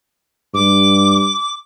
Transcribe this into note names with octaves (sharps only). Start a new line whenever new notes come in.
G2 D6